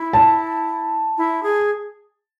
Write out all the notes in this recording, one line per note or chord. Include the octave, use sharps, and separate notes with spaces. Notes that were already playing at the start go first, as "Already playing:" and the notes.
Already playing: E4
A5
E4
G#4